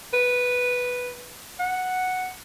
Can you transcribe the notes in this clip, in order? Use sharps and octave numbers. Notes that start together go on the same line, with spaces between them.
B4
F#5